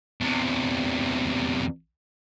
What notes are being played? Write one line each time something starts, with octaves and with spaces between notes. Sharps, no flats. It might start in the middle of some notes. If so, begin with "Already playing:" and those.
E2 C3